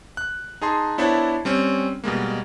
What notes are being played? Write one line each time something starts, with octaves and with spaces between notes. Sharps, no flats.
F#6
D#4 G#4 A5 C6
B3 D4 E4 C5 C#5 A5
G3 C4 C#4
B2 G3 G#3 A#3